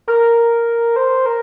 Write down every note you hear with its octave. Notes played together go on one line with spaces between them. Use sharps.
A#4
C5
A#4